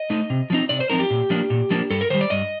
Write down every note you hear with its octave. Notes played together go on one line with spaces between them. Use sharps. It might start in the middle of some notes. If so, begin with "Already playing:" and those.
Already playing: D#5
A3 D#4
C3
F3 C4 D#4
C3 D5
C5
F3 C4 D#4 A#4
G4
A#2
F3 A#3 D4
A#2
F3 A#3 D4
G2 A4
A#4
D#3 G3 C5
D5
G2 D#5